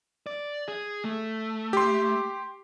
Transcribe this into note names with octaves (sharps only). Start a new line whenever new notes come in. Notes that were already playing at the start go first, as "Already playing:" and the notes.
D5
G#4
A3
G4 C6